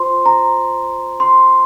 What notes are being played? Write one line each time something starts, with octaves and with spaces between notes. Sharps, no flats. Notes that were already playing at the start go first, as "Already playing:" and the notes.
Already playing: F4 C5 C6
A#5
C6